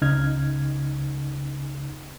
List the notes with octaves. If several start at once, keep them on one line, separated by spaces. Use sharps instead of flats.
C#2 C#3 D#4 F6 G#6